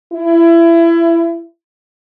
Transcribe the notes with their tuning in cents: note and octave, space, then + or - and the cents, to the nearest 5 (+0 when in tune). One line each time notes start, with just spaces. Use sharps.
E4 +25